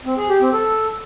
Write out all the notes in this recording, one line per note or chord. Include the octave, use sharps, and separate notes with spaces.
C4
G#4
G4
C4
A4